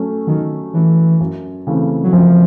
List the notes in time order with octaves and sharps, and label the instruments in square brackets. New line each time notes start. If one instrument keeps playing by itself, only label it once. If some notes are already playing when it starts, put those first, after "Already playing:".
Already playing: [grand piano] F#3 A3 C#4
[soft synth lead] D#3 [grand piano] F#3
[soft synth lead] E3 [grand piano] A3 C#4
[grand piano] F#2
C#3 E3 A3 C4
[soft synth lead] F#3
[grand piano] F#2 [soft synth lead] F3